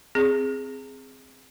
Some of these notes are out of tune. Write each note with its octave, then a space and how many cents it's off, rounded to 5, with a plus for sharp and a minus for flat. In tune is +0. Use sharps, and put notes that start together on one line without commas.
C4 +0 G#4 +0